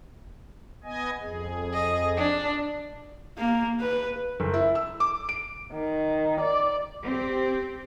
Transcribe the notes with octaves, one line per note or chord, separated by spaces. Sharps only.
B3 D#5 G#5
F2 G#4
D#5
D4
A#3
B4
F#1
E4
E6
D6
D7
D#3
D5
C4 G4